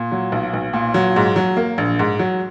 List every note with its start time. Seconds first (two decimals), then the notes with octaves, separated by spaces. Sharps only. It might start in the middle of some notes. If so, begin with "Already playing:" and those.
Already playing: A#2
0.12 F#3
0.32 B1
0.53 B1
0.73 A#2
0.94 F#3
1.16 G#2
1.36 F#3
1.57 A#3
1.78 A#1
1.99 G#2
2.19 F#3